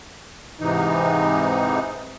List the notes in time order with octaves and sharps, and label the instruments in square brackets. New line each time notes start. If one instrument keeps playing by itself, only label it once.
[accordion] G#2 C3 E3 D#4